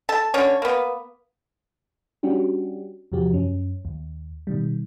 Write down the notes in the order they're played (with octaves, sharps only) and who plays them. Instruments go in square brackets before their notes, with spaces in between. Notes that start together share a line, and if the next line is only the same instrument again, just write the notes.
[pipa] A4 A5
D3 C#4 C#5
A#3 B3
[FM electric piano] G3 C#4 D4 F#4 G4
E2 C3 F3 F#4 G4
F#2 C#4
D#2
B2 D#3 G3